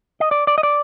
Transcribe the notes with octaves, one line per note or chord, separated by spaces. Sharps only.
D#5
D5
D5
D#5
D5